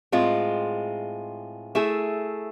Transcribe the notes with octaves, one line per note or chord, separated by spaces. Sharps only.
A2 G#3 C4 F4
A3 E4 G#4